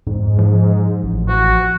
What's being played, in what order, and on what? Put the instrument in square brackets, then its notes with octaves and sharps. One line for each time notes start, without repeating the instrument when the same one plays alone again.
[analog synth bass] F2 [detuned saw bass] G#2
[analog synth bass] F3
[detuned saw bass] A1
[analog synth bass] F3 [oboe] F#4